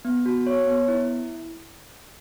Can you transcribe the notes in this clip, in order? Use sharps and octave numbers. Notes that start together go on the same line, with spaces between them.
B3
F#4
C#5
B3
E4